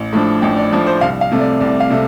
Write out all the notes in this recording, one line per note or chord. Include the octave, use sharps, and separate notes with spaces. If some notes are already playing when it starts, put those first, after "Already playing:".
Already playing: A1
A2 F3 D4
A1 G5
D5
A2 F3 D4
C5
C2 F5
F5
C3 A3
D5
C2 D5
F5
C3 A3